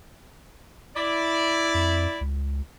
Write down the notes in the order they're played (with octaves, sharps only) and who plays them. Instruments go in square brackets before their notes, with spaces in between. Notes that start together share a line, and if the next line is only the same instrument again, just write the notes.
[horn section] E4 D5
[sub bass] F2
C#2